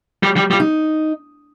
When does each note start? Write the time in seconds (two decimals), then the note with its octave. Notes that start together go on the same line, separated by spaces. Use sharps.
0.23 G3
0.36 G3
0.51 G3 F4
0.60 D#4